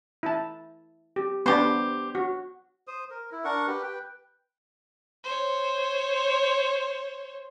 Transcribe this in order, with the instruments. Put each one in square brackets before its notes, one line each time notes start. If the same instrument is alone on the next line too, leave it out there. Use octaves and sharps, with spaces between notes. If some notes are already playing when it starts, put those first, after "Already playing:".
[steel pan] E4 A5
G4
[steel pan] B3 D4 [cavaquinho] G4 C5
[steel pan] F#4
[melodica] C5 D#6
A#4
E4
D4 A#4 F#5 C#6
G4 B4
B4 G5
[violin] C5 C#5